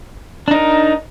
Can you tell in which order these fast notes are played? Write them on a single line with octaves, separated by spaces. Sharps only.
D4 D#4 A#4